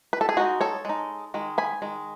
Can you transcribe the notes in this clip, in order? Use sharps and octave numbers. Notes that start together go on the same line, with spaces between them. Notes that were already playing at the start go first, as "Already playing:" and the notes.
B4
A4
G#4
G#3 D#4 F#4
A4 C#5
G#3 D#4
D#3 G#3
G#5 B5
D#3 G#3